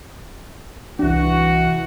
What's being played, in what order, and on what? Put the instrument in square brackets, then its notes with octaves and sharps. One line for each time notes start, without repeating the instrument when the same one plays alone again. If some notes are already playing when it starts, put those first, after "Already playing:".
[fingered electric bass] C2 D4 [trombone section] E3 [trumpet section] F#4